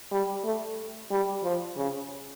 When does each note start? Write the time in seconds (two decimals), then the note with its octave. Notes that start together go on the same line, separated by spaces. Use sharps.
0.12 G3
0.45 A3
1.11 G3
1.44 F3
1.77 C#3